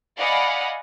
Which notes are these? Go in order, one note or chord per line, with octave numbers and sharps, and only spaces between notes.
D5 D#5 F5 F#5 G#5 B5